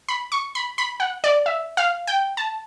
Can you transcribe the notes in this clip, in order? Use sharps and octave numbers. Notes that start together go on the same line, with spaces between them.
B5
C#6
B5
B5
F#5
D5
E5
F5
G5
A5